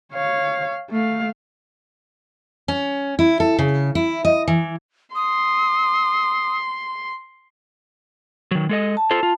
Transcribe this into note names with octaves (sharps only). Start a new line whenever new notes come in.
C#5 F5
A3 F5
C#4
E4
A4
C#3
E4
D#5
E3
C6 D#6
D#3 F#3
G#3 A4 D#5
A5
F4 A4 C5
F4